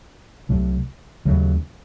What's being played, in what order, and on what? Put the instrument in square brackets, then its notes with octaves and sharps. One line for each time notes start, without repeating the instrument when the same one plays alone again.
[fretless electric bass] C2 C3 F#3 A3
D#2 C#3 F#3 A3